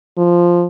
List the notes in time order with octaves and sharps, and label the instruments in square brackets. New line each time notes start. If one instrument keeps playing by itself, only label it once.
[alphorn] F3